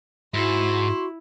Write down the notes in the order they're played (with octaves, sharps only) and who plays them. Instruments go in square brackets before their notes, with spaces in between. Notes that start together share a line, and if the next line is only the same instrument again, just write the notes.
[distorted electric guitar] G#2 [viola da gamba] E4 [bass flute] F#4 [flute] C6